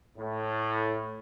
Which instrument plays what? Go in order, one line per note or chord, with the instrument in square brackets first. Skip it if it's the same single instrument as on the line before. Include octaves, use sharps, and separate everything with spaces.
[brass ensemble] A2